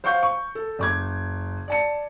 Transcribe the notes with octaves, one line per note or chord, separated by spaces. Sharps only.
C5 F5 F#5 C#6 G6
C#6
A4
F#1 D6 G#6
D5 A5 C#7